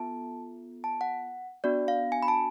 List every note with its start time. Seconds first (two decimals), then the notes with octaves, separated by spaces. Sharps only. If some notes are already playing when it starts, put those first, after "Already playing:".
Already playing: B3 F4 A4 A5
0.84 A5
1.01 F#5
1.64 B3 D4 F#4 D5
1.88 F5
2.12 G#5
2.23 B5
2.28 A5